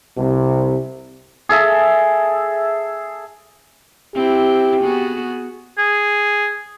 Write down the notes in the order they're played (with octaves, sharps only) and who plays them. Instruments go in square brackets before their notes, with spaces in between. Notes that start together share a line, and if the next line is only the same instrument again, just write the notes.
[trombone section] C2 C3
[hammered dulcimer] G#4 A4 E5
[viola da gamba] C4 E4 [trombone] G4
[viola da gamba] B3 F#4 G#4
[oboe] G#4